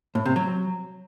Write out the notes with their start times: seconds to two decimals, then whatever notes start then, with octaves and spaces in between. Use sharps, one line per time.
0.15 A2
0.26 C3
0.36 F#3